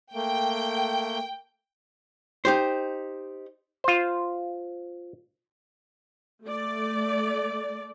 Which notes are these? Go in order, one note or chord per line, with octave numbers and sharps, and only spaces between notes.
A3 A#3 G5
D#4 G4 C5
F4 C5
A3 D5